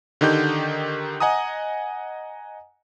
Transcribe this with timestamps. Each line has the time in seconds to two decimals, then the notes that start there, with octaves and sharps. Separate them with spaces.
0.21 D3 D#3 D#4 G4 G6
1.20 D#5 F#5 G#5 A#5 D#6